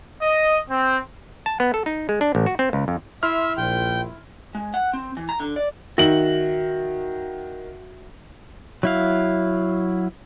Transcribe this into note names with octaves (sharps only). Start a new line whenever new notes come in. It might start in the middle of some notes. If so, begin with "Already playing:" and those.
D#5
C4
A5
B3
A4
D#4
G#3
D4
A1
F#4
C4
C#2
F2
E4 E5 C6 F6
A#1 G5
G#3
F#5
C4
E3
A#5
D3
D5
D#3 F#4 E5 F#7
F#3 E4 F5